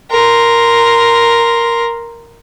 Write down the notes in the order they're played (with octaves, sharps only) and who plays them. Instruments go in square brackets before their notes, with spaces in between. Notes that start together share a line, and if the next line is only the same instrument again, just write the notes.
[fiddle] A#4 C6